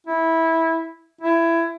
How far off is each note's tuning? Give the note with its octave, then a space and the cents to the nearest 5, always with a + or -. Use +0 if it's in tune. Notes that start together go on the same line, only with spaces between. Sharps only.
E4 -15
E4 +20